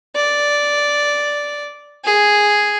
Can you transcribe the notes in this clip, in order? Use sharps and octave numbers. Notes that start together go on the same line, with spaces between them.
D5
G#4